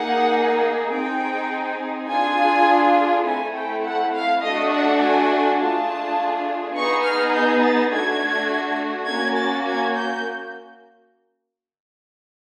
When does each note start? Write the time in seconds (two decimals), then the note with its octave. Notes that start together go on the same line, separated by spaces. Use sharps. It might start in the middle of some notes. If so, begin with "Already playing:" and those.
Already playing: A#3 D#4 G#4 F#5
0.91 C4 D#4 G#4 G5
2.08 D4 F4 G#4 G#5
3.25 A3 C4 E4 A4 G#5
3.54 G5
3.83 F#5
4.13 F5
4.42 A3 D4 F#4 D#5
4.71 F#5
5.00 G#5
5.58 A3 D4 F4 G#4 A5
6.75 B3 D#4 G#4 C#6
7.04 F6
7.34 G6
7.63 A6
7.92 A3 D4 F#4 A4 G#6
9.08 A#3 C#4 F#4 G#6
9.38 A6
9.67 G#6
9.97 G6